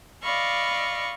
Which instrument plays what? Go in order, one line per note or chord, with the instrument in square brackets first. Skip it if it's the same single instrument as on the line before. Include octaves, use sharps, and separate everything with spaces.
[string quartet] D5 D#5 F5 B5 C#6